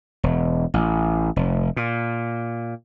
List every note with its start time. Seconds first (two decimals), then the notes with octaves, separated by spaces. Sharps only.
0.23 E1
0.74 A1
1.36 F1
1.77 A#2